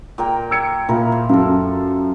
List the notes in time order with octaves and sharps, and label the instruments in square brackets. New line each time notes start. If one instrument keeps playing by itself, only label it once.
[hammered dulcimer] A#2 A#4 G5
[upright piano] E6 G#6 C#7
[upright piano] A#2 [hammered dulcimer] F3 E4 A#4
[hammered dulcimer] C5
[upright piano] F#2 [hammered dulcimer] A4 F5